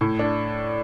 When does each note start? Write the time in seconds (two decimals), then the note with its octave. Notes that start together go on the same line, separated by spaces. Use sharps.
0.01 A2
0.19 D4